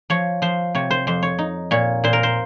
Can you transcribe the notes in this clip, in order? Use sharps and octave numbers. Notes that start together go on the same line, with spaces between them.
F3 C#5
F3 C5
C3 C#5
C5
F2 C5
C#5
D#4
A#2 C#5
A#2 C5
A#4
C5